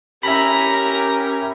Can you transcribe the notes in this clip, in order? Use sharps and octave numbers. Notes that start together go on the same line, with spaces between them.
C#4 G4 A#4 E5 A#5 B5